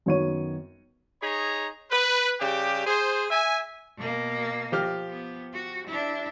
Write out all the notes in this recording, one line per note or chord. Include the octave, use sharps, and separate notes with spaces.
F#2 D#3 B3 C#5 C#6 D#7
D#4 G#4 C#5 A#5
B4
C#3 G3 G4
G#4 C5
E5 G#5
B2 A#3
F3 G4 F6
B3
F#4
D4 E4